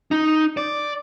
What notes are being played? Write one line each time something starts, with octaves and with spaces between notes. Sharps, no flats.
D#4
D5